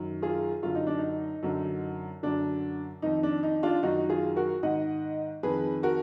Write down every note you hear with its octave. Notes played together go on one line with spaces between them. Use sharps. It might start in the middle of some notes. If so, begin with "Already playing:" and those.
Already playing: F#2 D#3
F4 G#4
F#2 D3 F4
D#4
D4
D#4
F#2 D3
F#2 D3 D4
F2 D#3 D#4
D4
D#4
D4 F4
F#2 D#3 D#4 F#4
F4 G#4
F#4 A#4
G#2 D#3 D#5 F#5
F2 D#3 G#4 B4
F#4 A#4